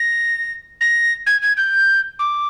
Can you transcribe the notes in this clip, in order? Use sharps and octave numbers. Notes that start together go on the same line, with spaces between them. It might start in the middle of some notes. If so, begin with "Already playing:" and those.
Already playing: A#6
A#6
G#6
G#6
G6
D6